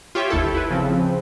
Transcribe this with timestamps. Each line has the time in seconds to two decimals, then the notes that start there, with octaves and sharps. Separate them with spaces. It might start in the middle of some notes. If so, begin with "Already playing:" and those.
0.15 F4 G4 C#5 E5 G5
0.30 G1 D#2 E4 A4
0.55 E4 B4
0.70 C#3 F3 C4